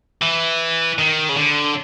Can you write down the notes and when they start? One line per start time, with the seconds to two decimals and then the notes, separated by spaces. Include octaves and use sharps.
0.22 E3
0.99 D#3
1.29 C#3
1.37 D3